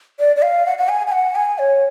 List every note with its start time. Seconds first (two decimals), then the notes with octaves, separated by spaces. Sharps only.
0.19 D5
0.36 D5
0.42 F5
0.66 F#5
0.78 F#5
0.89 G#5
1.07 G#5
1.12 F#5
1.36 G#5
1.58 C#5